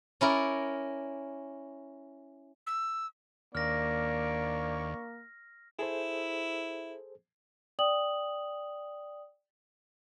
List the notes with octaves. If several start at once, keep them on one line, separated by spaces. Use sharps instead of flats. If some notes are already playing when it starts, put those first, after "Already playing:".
C#4 E4 A#4 D5
E6
D#2 A#3 D4 D5 C#6 F6 A#6
E4 G#4 A4 C5
D5 G5 D#6 F#7